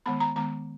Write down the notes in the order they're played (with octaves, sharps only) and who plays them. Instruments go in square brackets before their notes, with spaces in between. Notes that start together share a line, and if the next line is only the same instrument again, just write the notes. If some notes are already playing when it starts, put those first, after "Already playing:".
[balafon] D#3 G#3 B3 B5
A#5
D#3 G#3 B3 A#5